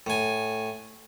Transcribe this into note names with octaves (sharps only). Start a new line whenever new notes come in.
A2 G#5